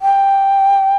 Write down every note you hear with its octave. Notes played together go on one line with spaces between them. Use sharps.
G5